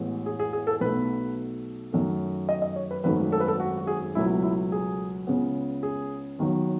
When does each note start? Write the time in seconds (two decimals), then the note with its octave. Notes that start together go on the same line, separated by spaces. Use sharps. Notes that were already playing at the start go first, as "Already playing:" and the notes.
Already playing: A1 A2 G#3 B3
0.26 G#4
0.39 G#4
0.53 G#4
0.67 A4
0.81 B1 B2 A3 B4
1.93 F#2 D#3 A3
2.49 D#5
2.62 D#5
2.76 C#5
2.91 B4
3.04 G#1 F#2 D#3 A3 B4
3.32 A4
3.40 B4
3.48 A4
3.60 F#4
3.78 F#4
3.87 G#4
4.15 C#2 B2 F#3 A3 E4
4.43 E4
4.72 G#4
5.27 C#2 C#3 G#3 B3
5.83 G#4
6.39 D#2 D#3 F#3 B3